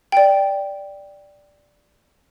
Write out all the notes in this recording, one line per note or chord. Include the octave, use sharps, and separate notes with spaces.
D5 G5